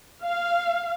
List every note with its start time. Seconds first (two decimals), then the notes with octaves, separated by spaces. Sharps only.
0.22 F5